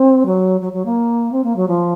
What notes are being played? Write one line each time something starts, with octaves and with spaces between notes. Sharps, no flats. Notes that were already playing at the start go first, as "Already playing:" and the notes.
Already playing: C4
F#3
F#3
F#3
A#3
C4
A#3
F#3
F3